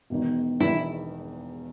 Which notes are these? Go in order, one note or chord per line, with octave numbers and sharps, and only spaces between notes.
E1 E2 D#3
E1 E2 D#3 E4